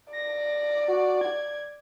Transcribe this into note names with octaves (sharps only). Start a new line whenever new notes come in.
D5 A#6
F#4
G#6